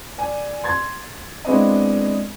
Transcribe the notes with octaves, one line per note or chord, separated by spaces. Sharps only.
D5 G#5
C6 G#6 A6
G#3 B3 C4 D4 E4 D#5